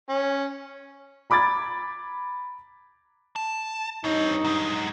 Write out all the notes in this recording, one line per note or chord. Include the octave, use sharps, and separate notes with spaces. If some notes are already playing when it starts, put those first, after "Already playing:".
C#4
A#5 B5 D6 G#6 A6
A5
G2 C4 D#4 C#5
F#3 G#3